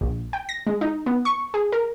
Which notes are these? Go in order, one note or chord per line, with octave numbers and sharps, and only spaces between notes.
A#1
G5
A#6
G#3
D#4
B3
C#6
G#4
A#4